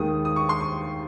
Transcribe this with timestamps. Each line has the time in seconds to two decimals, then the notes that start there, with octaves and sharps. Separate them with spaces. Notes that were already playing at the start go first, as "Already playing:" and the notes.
Already playing: D#2 D#3 G#3 D#6
0.25 D#6
0.36 C#6
0.49 C6
0.61 C#6